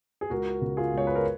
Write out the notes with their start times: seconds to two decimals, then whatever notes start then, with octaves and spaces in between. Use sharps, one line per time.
0.21 G#4
0.30 C#2 F#4 A#4
0.61 C#3
0.77 F4 G#4
0.93 C#2 C#5
1.07 B4
1.16 A#4